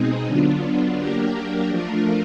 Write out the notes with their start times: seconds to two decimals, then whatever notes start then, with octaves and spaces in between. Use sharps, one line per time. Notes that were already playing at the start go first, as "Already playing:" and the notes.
Already playing: B2 G#3 C4 D#4 G#4
0.27 D3 F#3 B3 D4 F4
0.97 F#3 A#3 D4 G4 A#4
1.69 F3 A3 D4 F4 A#4